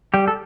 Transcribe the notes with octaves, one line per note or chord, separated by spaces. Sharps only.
G3 G4
A4